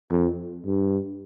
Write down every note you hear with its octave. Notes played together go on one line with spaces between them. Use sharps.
F2
G2